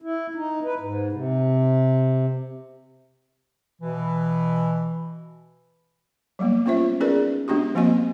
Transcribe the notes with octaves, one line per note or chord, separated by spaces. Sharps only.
E4
D#4
B4
G#2
C3
B2 E3
F#3 G3 A#3 B3
B3 C#4 F4 C5 E5
C#4 D#4 G#4 A#4 B4 D5
G#3 B3 D4 F#4 G4
F3 A#3 C4 F#4 D#5 G#5